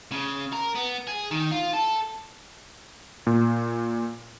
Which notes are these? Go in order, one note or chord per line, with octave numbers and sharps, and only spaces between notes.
C#3
A#4
B3
G#4
D#3
F4
A4
A#2